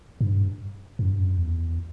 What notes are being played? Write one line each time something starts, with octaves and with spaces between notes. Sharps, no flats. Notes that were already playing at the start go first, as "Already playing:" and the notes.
G2
F#2
G2
F#2
E2